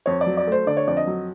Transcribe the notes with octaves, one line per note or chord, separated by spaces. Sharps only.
F2 C#5
D5
F#3
D5
A3 C5
D3 D5
C#5
F2 D5
D#5
F#3